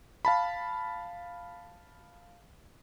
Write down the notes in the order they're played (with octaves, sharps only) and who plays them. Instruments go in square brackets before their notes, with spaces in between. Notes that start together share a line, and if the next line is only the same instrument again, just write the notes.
[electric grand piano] F5 A5 B5